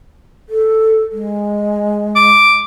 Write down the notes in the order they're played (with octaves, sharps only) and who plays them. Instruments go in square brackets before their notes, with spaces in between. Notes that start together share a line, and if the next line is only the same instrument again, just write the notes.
[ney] A4
G#3
[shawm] D6